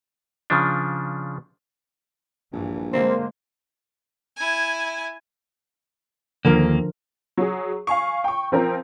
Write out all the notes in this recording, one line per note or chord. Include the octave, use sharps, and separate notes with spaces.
C#3 F3 D4
A#1 G2 E3
D3 G#3 A#3 C4 C5
E4 G#5
D#2 G#2 D3 F3 A#3 A#4
F#3 G#4
F5 G#5 C#6
G5 C#6
F3 C4 A#4